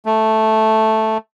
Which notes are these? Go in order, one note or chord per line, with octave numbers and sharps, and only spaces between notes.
A3